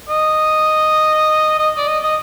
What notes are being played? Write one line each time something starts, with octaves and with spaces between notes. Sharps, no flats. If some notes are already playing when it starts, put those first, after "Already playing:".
D#5
D#5
D5
D#5
D#5